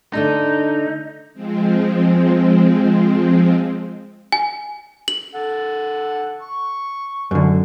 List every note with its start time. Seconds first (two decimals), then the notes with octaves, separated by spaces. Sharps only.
0.13 D3 A3 D4 D#4
1.33 F3 G#3 C4
4.32 G#5
5.08 F#7
5.35 A4 F#5
6.42 C#6
7.31 F#2 D3